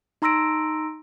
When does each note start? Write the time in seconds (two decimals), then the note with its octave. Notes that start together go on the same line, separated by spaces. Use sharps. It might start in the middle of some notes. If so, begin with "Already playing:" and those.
0.22 D#4 A#5 C6 E6 A#6 D7